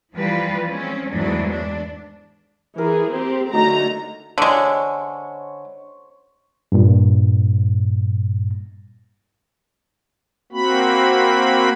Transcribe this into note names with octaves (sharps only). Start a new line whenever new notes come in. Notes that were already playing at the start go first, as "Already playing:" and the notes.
E3 F3 G3 A#3 F4 B4
G#3 C4 C#4
E2 G#2 E3 F#3 A3 D4
E3 D4
E3 G#4 A#4
C4 G4
D3 F#3 A3 D#4 A#5
D3 G#3 C5 C#5 B5
G2 A#2
A#3 C4 F#4 B5